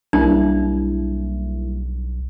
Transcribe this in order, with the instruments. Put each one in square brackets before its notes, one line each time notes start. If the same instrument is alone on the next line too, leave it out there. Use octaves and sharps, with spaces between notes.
[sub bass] B1 [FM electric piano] G3 A#3 E4 [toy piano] D4